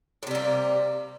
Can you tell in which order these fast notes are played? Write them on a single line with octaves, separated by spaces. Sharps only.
A2 C3 G3 A#3